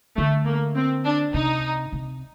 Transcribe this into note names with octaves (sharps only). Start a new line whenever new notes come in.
D3 A3
A#3
C4
D4
C3 D#4
C3